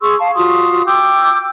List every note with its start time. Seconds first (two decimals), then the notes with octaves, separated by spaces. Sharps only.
0.01 G#4 C6 C#6 E6
0.19 F5 A5
0.36 F4 F#4 C6 D#6
0.86 G5 D6 E6 G6